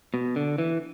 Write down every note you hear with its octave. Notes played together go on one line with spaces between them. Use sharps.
B2
D3
E3